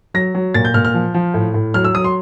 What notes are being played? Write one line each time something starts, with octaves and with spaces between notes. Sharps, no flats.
F#3 A#6
F#3
A#2 A6
G6
A#2 F6
F6
F3
F3
A2
A2
F#3 F6
E6
F#3 D#6
C6